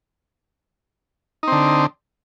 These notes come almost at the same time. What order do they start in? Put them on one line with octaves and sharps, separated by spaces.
D#4 C4 D3